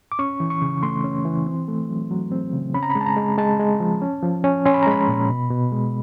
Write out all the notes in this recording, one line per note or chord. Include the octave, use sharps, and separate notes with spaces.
D6
C#4 C#6
E3
C#6
C#3
A3 C6
C#4
E3
C4
A3
F#3
F#3
C4
C#3
C#4 B5
A#5
B5
G#3
A5
A#5
G#3
G#3 A5
G#3
F3
C#4
F3
C#4
C#4 C6
B5
A#5
G#3 B5
A#2
B2
B2
G#3